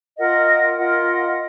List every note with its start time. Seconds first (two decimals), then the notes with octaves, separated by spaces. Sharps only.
0.18 F4 A#4 D#5 F#5
0.77 F4 A#4 D#5 F#5